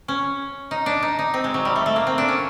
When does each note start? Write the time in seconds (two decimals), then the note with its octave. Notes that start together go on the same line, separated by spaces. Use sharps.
0.08 C#4
0.71 D#4
0.86 D4
1.03 D#4
1.19 D#4
1.34 C4
1.44 G#3
1.54 F#3
1.65 G3
1.76 A3
1.86 A3
1.96 A#3
2.07 C4
2.18 D4
2.28 C#4